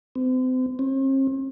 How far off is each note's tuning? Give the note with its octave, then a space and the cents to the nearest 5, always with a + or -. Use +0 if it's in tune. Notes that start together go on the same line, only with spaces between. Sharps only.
C4 -35
C4 +45